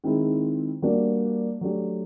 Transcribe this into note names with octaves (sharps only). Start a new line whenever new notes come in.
D#3 G#3 C4 E4
G3 A#3 D4 F#4 A#4
F#3 A3 D4 G4